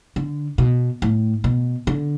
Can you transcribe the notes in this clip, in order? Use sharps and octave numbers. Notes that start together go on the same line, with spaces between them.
D3
B2
A2
B2
D3